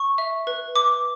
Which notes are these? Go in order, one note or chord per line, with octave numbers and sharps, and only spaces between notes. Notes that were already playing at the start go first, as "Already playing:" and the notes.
Already playing: C#6
E5
B4
B4 D6